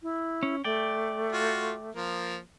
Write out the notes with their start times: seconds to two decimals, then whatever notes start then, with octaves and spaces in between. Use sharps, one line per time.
0.02 E4
0.43 C#4
0.64 A3 D5 G5
1.32 F4 F#4
1.95 F3 A#3